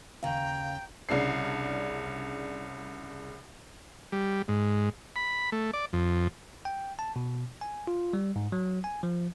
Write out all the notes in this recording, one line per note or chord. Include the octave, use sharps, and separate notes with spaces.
D#2 C#3 F5 G5 A#5
C2 C#3 D4 C7
G3
G#2
B5
A3
D5
F2
G5
A5
B2
G#5
F4
G3
G#2
F#3
G#5
F3